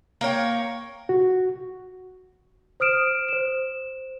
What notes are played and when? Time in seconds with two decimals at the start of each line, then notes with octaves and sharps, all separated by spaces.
0.21 A#3 A#4 C#5 G5
1.09 F#4
2.80 C5 D#6 F6 D7 E7
3.28 C5 E7